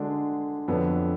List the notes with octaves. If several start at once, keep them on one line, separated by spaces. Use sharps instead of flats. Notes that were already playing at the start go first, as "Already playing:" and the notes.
Already playing: D3 G#3 D4 F#4
F2 D3 F#3 B3 D4